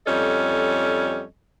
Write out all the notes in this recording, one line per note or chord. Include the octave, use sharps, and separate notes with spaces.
F2 G3 C#4 A4 D#5